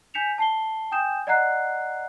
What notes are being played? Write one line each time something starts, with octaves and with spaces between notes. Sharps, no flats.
G#5 G6 B6 C#7 E7 F7
A5 C7 G7
G5 G#5 D#6 G6 E7
D5 D#5 F#5 A#5 F#6 C7